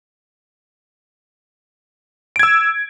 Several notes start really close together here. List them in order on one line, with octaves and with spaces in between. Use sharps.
D7 G#6 E6